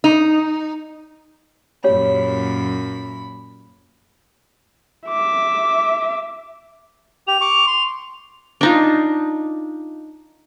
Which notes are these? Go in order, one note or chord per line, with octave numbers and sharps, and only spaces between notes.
D#4
F#2 A#2 C#4 G4 C#5 B5
E5 D6
G4 F7
C#6 D6
C6
D4 D#4 F4